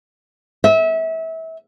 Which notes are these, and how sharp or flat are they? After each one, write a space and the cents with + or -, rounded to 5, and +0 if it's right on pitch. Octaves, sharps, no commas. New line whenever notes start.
E5 -30